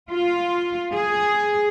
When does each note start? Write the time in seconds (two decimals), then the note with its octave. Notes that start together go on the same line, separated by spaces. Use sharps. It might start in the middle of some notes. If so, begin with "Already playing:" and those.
0.10 F4
0.93 G#4